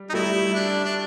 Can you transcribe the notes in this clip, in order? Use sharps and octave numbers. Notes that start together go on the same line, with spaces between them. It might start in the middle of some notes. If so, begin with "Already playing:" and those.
Already playing: G3
D#4
G3 A3 E4
D4
D4